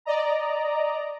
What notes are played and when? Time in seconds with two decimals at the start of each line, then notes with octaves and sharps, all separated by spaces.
0.05 D5 D#5 A#5